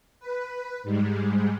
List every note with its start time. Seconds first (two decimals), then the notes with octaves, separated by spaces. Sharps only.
0.20 B4
0.83 G#2 G3 G#3